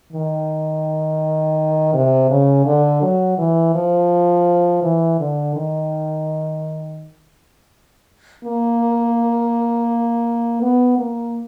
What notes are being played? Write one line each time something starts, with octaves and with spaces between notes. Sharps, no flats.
D#3
C3
C#3
D3
F#3
E3
F3
E3
D3
D#3
A#3
B3
A#3